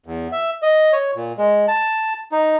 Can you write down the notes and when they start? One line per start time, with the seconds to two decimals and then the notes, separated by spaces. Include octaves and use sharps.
0.06 E2
0.32 E5
0.62 D#5
0.93 C#5
1.16 A#2
1.38 G#3
1.68 A5
2.32 D#4